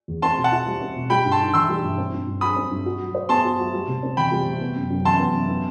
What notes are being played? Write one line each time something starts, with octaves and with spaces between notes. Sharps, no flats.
E2
C4 A5 C6
B2
F#5 A5
E4
G3
C4
B2
G3 G5 B5
G2
A5 C6
D#4
E3 C6 E6
G3
G2
C4
G2
G2
F#3 B5 D#6
C4
G2
F#4
F#3
C5
B3 A5 C6
F#4
F#3
G3
C3
C4
E3 G5 B5
G3
C3
B3
F#2
F#2
E3 A5 C6
B3
F#2
B3